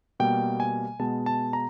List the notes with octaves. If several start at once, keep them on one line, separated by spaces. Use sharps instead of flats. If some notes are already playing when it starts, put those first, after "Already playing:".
B2 G3 A#3 G5
G#5
B2 G#3 B3 A5
A5
A#5